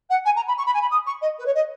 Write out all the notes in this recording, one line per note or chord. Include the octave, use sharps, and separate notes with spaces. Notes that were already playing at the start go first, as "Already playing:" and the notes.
F#5
G#5
A#5
B5
C#6
B5
G#5
B5
D#6
C#6
D#5
B4
C#5
D#5